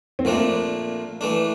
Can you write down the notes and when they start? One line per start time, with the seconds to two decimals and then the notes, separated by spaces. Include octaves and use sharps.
0.19 C4
0.25 A#2 F3 A3 A#3 D4
1.21 E3 A3 D4